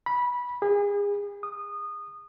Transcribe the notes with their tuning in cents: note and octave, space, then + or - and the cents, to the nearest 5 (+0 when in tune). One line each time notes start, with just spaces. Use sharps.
B5 -15
G#4 -35
D#6 -20